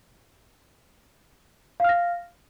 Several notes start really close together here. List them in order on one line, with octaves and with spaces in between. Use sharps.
F5 F6 A#6